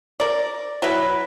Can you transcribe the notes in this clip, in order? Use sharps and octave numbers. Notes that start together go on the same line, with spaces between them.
A#4 D5
F#3 E4 B4